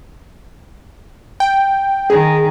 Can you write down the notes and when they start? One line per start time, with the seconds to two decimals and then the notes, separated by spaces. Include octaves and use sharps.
1.40 G5
2.10 D#3 G#4